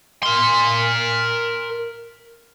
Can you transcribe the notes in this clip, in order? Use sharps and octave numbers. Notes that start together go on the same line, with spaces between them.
A#4 C6